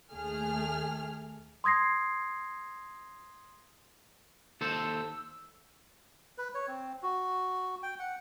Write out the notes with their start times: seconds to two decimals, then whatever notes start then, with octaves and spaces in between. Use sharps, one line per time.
0.13 D#2 A3 G#4 F6
1.64 C6 D#6 G#6 A#6 C7
4.61 D#2 A4 C5 E6
6.38 B4
6.54 C#5
6.68 C4
7.03 F#4
7.83 G5
7.99 F#5